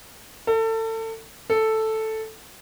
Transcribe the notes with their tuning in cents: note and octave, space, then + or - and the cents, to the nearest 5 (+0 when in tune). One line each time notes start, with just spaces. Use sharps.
A4 +30
A4 +0